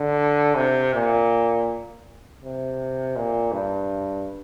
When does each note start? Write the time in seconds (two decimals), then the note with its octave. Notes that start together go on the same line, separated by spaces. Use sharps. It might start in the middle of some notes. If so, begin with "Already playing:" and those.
Already playing: D3
0.56 C3
0.94 A#2
2.42 C3
3.16 A#2
3.52 G2